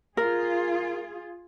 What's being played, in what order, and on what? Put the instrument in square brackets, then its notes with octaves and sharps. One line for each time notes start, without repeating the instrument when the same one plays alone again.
[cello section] F4 G#4 [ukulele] A#4